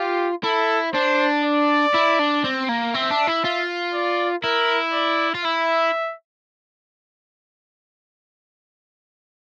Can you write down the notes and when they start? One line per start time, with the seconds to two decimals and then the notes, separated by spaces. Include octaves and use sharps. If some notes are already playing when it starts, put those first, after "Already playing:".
Already playing: F4 G4
0.44 E4 A4
0.94 D4 C5
1.43 D5
1.94 E4
2.19 D4
2.44 C4
2.69 A#3
2.94 C4 E5
3.10 D4
3.27 E4
3.44 F4
3.94 D5
4.44 E4 A#4
4.94 D5
5.34 F4
5.44 E4 E5